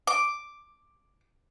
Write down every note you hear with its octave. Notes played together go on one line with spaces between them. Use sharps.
D6